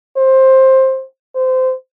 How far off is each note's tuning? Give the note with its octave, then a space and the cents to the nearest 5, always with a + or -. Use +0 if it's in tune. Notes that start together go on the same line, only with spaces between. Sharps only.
C5 +15
C5 -20